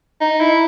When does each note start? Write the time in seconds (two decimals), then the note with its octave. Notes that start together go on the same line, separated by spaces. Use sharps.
0.21 D#4
0.40 E4